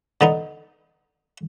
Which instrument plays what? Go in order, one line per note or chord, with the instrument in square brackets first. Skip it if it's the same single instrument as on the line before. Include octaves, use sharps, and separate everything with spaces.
[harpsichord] D3 B3 D#4